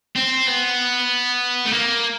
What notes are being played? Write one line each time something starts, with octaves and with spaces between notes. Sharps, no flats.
C4
B3
A3
A#3